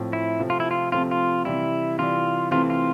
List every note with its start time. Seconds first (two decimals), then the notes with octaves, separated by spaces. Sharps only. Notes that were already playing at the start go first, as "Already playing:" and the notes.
Already playing: A2 F3 C4
0.13 E4
0.40 C3 F3 A3 C4
0.50 F4
0.60 E4
0.71 F4
0.92 C3 F3 A3 C4 F4
1.11 F4
1.45 C3 E3 G3 E4
1.99 C3 E3 G3 F4
2.51 C3 E3 A3 C4 F4
2.70 F4